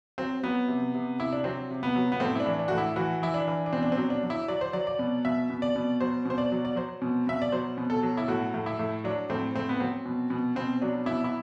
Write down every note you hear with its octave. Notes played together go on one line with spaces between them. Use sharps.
F#3 C4
F#3 B3
C3
C3
C3 E4
D4
F#3 C4
C3
B3
F#3
B3
A2 C4
E4
D4
E3
D4
A2 F#4
E4
E3 F#4
E3 E4
D4
E3
D4
B2 C4
D4
C4
F#3
D4
F#3
E4
F#3 D5
C5
F#3 D5
D5
B2
B2 E5
B2
D5
B2
F#3 C5
B2 C5
D5
F#3
D5
F#3 C5
B2
B2 E5
D5
F#3 C5
B2
A4
F#3
E4
A2 F#4
A2
E4
A2
F#3 D4
A2 C4
A2 C4
B3
F#3 C4
B2
B2
B2 C4
F#3 D4
B2 E4
E4